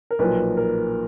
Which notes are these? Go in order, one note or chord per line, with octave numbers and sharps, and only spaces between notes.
A#4
B1 A#2 F3 B4
A#4